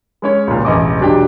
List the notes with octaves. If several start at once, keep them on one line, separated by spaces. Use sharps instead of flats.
G#3 C#4 C#5
C#2 A#2
E1 A1 D#5 D6
E1 F#3 D4 G4 G5